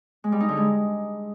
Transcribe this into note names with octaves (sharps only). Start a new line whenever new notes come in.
G#3
G3
D#4
D3
G#3